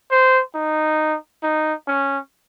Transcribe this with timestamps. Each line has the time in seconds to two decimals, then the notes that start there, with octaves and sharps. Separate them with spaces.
0.11 C5
0.55 D#4
1.43 D#4
1.87 C#4